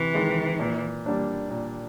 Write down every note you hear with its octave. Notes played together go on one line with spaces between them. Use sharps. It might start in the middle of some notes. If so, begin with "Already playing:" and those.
Already playing: C3 E3
D#3 G#3
A#2
G3 A#3 D4
A#2